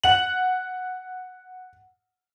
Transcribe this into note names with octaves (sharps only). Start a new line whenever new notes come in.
F#5 F#7